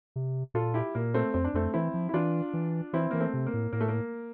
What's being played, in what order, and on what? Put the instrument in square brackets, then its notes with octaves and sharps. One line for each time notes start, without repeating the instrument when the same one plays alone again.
[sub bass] C3
[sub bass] A#2 [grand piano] F4 A4
[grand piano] E4 G4
[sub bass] A#2 [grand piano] A#3
[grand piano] A3 C4
[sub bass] F2 [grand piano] C4
[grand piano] D4
[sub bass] F2 [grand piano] A3 C4
[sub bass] E3 [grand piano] C4 E4
[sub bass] F3
[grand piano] E4
[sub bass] E3 [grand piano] D4 F4
[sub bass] E3
[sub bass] E3 [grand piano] C4 E4
[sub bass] E3 [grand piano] A#3
[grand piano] A3 C4
[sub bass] C3
[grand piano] A#3
[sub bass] A2
[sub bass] A2 [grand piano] A#3
[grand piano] A3
A#3